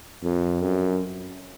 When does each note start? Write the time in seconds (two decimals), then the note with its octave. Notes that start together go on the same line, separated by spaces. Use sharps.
0.23 F2
0.62 F#2